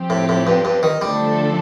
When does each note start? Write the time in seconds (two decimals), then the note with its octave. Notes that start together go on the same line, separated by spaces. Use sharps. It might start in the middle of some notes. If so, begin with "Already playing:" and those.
Already playing: F3 C4 G4
0.10 A2
0.29 A2
0.47 G2
0.65 G2
0.83 D#3
1.01 D3 F3 G3 A3 D4 A4